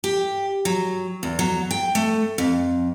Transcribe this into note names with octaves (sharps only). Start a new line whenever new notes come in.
G4
F#3
E2
F#3
G5
A3
F2